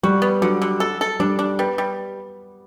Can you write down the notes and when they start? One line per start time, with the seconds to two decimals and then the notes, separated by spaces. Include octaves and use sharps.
0.03 G3 F#4
0.22 B3
0.42 D3 F#3
0.62 D3
0.80 A4
1.01 A4
1.20 G3 D4
1.39 D4
1.59 G3 B3
1.78 G3